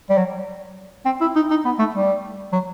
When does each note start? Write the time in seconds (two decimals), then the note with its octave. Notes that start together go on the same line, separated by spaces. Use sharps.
0.10 G3
0.18 F#3
1.06 C4
1.21 E4
1.36 D#4
1.50 D#4
1.65 B3
1.79 A3
1.95 G3
2.53 F#3